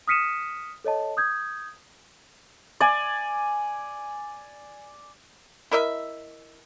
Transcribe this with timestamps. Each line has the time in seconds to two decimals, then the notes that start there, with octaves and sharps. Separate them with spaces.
0.08 D#6 F6 B6 C#7 D#7 E7
0.84 A4 C#5 D#5 A5
1.17 D#6 G6 G#6
2.81 D5 G#5
5.71 E4 A#4 D#5 E5